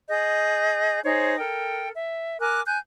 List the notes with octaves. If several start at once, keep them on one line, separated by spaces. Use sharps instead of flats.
G#4 D#5 G6
D#4 G#4 C5 C#5
A4 A#4 G5
E5
A#4 G#5 D6 F#6
G#5 F#6 G6